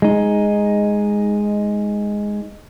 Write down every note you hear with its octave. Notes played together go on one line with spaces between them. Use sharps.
G#3 D#4